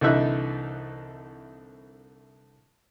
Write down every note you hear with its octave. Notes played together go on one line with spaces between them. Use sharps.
C2 D3 E3 D#4 E5 F#6